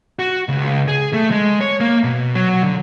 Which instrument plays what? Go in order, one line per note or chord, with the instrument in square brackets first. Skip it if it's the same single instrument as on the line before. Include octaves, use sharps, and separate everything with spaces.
[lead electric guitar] F#4
C#2
G#4
A3
G#3
C#5
A#3
B2
F#3
D3